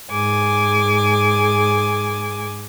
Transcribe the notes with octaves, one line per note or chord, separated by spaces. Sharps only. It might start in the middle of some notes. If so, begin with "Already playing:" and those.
G#2 G#4 G#5 D6